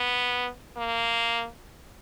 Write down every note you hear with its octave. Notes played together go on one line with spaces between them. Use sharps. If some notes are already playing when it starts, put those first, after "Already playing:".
Already playing: B3
A#3